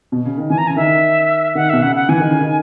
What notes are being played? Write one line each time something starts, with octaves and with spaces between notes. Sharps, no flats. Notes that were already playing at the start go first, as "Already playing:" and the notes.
B2
C#3
D#3
E3 G#5
A#5
C#3 G#5
D#3 E5
D#3 F#5
B2 E5
C#3 F#5
F#5
E3 G#5
D#3
C#3
D#3